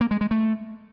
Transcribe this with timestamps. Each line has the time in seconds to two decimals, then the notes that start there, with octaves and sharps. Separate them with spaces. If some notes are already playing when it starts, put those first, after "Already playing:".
0.01 A#3
0.11 G#3
0.21 G#3
0.31 A3